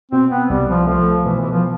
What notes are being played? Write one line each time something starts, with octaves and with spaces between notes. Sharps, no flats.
B2 C4
B3
C2 G3
F3
F3 A3
B2 E3
E3
F3